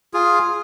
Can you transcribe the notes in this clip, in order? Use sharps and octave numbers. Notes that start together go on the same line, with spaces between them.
F4 G#4